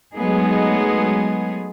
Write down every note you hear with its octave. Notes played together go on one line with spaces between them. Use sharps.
F#3 G#3 A3 B3 D#4 G#4